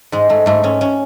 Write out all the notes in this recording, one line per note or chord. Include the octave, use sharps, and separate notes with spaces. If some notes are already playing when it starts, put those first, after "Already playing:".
G#2 G#3
G#2 A3
G#2 A3
G#2 C#4
C#4